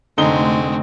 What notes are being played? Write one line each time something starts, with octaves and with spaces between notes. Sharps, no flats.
F1 D3 G#3 A3 C4 D#4 G7